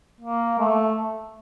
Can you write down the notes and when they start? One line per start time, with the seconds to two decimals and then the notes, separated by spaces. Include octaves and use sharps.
0.21 A#3
0.59 A3